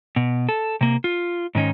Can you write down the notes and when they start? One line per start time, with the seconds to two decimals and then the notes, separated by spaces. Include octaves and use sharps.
0.16 B2
0.49 A4
0.81 C3 A#3
1.04 F4
1.55 G#2 D#3 C#4 D#4